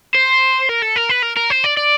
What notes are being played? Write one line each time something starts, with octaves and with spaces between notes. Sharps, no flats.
C5
A#4
A4
A#4
B4
A#4
A#4
C5
D5
D5